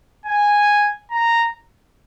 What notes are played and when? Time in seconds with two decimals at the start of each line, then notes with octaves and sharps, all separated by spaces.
0.26 G#5
1.11 A#5